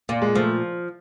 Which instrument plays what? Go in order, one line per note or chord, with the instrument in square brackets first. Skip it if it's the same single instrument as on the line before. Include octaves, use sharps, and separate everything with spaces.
[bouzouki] A#2 [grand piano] A#3
[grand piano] G#3
[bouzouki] F3 [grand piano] A3